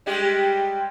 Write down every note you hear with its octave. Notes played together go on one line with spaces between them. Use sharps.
G3 G#3 G4